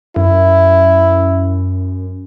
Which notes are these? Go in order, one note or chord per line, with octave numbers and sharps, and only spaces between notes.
F#2 E4